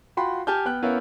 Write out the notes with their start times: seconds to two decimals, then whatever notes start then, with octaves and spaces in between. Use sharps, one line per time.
0.17 F4 F#4 G5 B5 C6
0.47 G4 G#5 A5 F6 G6
0.65 B3 G5 F#6
0.82 B3 C#4 E4 A#4 C#5 F5